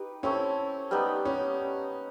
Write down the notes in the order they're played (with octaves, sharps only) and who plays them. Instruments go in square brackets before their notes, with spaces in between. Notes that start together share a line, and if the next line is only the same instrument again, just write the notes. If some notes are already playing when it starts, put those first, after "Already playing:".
Already playing: [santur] D#4 G4 B4
[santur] C4 E4 A4 C#5 [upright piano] C#4
[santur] G3 B3 D#4
[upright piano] C#4